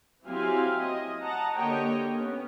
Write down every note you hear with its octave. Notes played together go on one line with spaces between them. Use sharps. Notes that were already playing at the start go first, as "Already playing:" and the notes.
F#3 C4 E4 G4 F5 G#5
D#5
D#5 F#5 A5 A#5
D3 A#3 G4 C#5 D#5 G5
B3 C#4